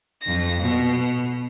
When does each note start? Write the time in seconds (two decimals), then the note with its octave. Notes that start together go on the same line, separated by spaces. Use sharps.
0.21 F2 A#6
0.60 B2